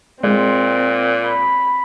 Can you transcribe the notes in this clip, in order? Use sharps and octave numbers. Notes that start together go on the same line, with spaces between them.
A#2 G#3 C4
B5